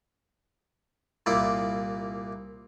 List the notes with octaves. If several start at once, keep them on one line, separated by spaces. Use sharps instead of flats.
C2 A#2 A#3 E4 D5